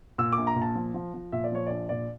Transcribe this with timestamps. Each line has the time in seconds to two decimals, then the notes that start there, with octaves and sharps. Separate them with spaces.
0.18 A#2 E6
0.32 A#1 D6
0.47 A#5
0.56 A#2
0.62 A5
0.75 F3
0.94 F3
1.14 F3
1.32 A#2 E5
1.44 D5
1.52 F3 C#5
1.67 A#1 D5
1.89 A#2 D5